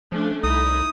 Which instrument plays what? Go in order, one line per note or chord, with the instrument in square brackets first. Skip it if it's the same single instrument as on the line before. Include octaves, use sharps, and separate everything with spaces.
[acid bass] F3 [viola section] A3 C#4 D4
[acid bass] C2 [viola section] D#4 E4 [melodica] D#6